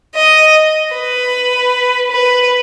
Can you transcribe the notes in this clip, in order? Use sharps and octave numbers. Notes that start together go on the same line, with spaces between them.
D#5
B4
B4